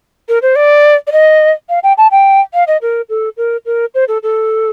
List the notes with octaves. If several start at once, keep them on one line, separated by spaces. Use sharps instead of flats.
A#4
C5
D5
D5
D#5
F5
G5
A5
G5
F5
D#5
A#4
A4
A#4
A#4
C5
A4
A4